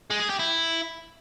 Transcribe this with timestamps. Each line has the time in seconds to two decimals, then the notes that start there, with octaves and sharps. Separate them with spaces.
0.10 G#3
0.20 G#4
0.30 G4
0.39 E4